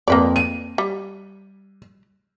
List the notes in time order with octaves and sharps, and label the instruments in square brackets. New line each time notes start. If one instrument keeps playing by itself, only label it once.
[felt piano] F2 [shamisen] A#3 B4 D5
[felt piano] D#7
[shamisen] G3